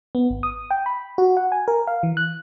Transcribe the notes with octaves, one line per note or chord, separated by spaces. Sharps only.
B3
G#1
D#6
G5
B5
F#4
F#5
G#5
A#4
F5
E3
F#6